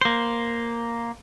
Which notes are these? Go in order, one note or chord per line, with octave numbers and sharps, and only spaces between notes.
A#3 C5